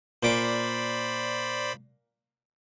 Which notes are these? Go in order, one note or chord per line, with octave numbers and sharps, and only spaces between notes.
A#2 C5 D5 B5 D6